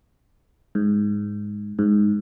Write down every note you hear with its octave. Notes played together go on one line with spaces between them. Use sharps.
G#2
G#2